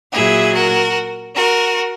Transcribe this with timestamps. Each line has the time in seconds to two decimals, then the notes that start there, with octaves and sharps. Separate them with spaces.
0.13 A#2 F#3 E4 G#4
0.54 F#4 A#4
1.36 F#4 A#4